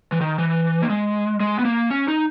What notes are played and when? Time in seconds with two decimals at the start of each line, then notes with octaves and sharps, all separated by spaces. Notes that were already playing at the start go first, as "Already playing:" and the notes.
0.12 E3
0.21 D#3
0.38 E3
0.82 A#3
0.90 G#3
1.40 G#3
1.59 B3
1.65 A#3
1.90 C#4
2.08 D#4